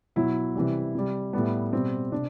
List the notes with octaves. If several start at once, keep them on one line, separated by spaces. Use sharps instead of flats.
B2 F#3 E4
C3 E3 G3
C3 G3
A2 G3 B3
B2 G3 C4
C3 D4